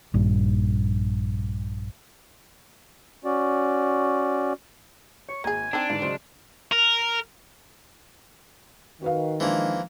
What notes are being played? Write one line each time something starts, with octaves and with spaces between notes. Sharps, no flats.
A#1 G2
C#4 F#4 D5
C#5 C#6
G#1 A#3 G#4 G#5
C4 D4 D#4 E6
G#2 D3 E3 F5
C#3 F#3 G#3 C5
A#4
D#3 F#4 B4 F5
E3 F3 G#3 A#3 D4